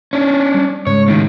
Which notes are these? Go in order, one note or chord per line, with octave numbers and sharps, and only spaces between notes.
C#4 D4
G3
G#2 C#3 G#3 C#5
A2 D#3